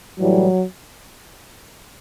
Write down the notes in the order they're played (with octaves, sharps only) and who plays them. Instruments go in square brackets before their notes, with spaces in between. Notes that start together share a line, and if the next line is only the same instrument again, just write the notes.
[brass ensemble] A2 E3 G3 [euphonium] F#3